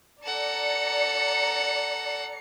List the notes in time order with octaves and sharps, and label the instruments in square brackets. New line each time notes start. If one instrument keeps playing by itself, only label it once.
[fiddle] A4 F#5 [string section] D5 A#5 C#7